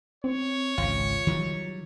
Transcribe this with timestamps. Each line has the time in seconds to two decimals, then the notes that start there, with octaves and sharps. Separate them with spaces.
0.24 C4 C#5
0.78 G#1 C#2 F4
1.27 D#3 F#3 G3